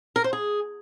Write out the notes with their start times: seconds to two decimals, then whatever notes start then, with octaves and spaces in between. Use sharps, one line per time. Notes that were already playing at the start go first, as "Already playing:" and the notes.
0.16 A#4
0.24 C5
0.33 G#4